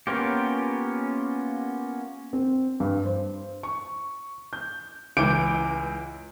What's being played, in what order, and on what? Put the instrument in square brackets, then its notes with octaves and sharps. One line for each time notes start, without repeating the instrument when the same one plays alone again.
[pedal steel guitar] A#3 B3 C#4 F4 G4
[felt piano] C4
G2
C5
C#6
G6
[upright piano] C#2 E3 D6 G6 D7